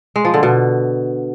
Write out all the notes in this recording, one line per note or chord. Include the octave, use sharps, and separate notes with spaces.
G#3
F3
D3
B2